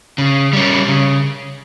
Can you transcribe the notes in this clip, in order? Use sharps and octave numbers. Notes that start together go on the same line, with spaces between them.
C#3
G3 C#4
C#3